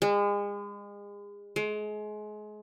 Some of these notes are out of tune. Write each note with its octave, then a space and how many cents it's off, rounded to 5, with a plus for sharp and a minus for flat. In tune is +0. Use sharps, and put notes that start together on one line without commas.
G#3 -35
G#3 +30